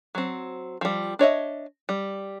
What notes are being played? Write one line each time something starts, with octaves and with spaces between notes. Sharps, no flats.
F#3 C4
F3 G3
D4 C#5 D#5 E5
G3